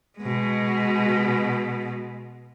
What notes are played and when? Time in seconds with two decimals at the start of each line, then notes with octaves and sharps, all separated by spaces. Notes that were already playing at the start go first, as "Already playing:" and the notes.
0.19 B2 G#3